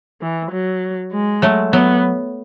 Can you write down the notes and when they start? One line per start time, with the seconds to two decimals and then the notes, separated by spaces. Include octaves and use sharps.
0.22 E3
0.51 F#3
1.12 G#3
1.42 F#3 A3
1.73 F#3 B3